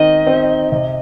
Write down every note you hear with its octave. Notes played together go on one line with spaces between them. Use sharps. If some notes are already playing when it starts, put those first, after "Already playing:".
Already playing: D#3 C4 D#4 D#5
C4 D#4
C3